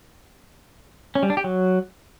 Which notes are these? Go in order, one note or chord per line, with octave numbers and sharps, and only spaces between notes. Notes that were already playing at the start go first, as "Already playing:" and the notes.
C#4
G3
D4
G4
F#3